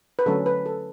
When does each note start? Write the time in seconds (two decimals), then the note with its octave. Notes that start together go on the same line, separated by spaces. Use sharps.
0.19 B4
0.26 D3 F#3 A3 C#4 A4
0.46 B4
0.66 A4